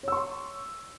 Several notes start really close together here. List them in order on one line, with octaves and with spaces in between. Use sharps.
C#5 E6 C#6 C6